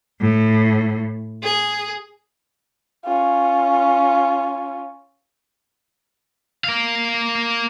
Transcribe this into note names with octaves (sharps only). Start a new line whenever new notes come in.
A2
G#4
C#4 F4
A#4 F5